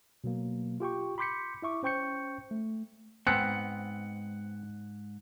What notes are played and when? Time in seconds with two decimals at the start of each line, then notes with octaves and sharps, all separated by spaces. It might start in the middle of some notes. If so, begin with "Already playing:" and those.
0.24 B2 F#3 A#3
0.80 F4 G4 G5 C#6
1.18 B5 C6 D6 G6 B6 C#7
1.62 E4 E5 C#6 D6
1.83 C#4 C5 G5 C#6 G6 C#7
2.51 A3
3.27 E2 G#2 B3 C4 F#6 C#7